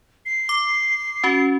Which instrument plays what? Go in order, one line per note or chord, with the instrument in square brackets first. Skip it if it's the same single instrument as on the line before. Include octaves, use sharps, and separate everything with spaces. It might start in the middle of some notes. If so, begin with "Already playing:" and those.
[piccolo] C7
[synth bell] D6
C#4 F#4